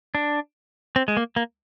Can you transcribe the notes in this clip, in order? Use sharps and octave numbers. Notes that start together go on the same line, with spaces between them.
D4
C4
G#3
A#3
A#3